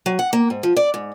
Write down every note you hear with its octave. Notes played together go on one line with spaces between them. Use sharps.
F#3
F#5
A#3
G#2
F3
D5
G#2